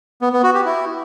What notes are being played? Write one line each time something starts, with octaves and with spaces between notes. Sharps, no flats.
B3
B3
F#4
G4
E4